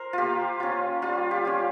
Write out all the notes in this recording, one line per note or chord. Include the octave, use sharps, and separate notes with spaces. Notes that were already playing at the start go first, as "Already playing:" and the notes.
Already playing: A#4 C5
A#3 F4 G4
C#4 F4
G3 F4
G4
C#4 F4